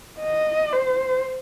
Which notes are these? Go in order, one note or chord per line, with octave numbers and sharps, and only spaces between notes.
D#5
C5